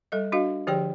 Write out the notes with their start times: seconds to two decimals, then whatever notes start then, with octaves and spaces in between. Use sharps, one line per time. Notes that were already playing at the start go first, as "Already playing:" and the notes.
0.12 G3 A4 D#5
0.32 D4 F#4 D#5 F5
0.67 D3 F3 G4 G#4 C#5 G5